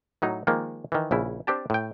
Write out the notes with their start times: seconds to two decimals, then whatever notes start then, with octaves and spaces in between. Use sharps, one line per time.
0.22 A2 F#3 D#4
0.47 D#3 F3 G#3 A#3
0.92 D#3 E3
1.11 A#1 C#3 E4
1.47 C4 D4 G4 A5
1.70 A2 G5